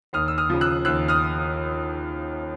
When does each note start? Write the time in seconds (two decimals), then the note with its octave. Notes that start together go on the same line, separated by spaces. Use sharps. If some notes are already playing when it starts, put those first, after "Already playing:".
0.13 D#2 D#6 F6
0.28 E6
0.38 D#6 F6
0.50 C#3 F3
0.61 E6 F#6
0.85 D#2 E6 F#6
1.08 D#6 F6